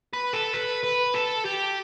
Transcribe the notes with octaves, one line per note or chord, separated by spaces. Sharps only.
B4
A4
B4
B4
A4
G4